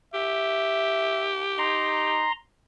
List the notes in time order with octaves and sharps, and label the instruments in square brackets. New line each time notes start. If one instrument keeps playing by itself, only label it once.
[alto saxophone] G4 [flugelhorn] E5
[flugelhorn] D#4 [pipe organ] A#5 C6